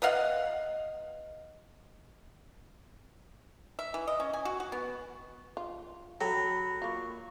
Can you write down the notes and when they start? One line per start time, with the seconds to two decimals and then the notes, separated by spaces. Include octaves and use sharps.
0.02 B3 D#5 F5 F#5
3.79 E5
3.94 E3
4.08 D#5
4.20 C#4
4.33 G#5
4.45 F#4
4.60 F#4
4.72 B3
5.57 F4
6.21 F#3 A4 G5 B5
6.82 A#3 F4 C#6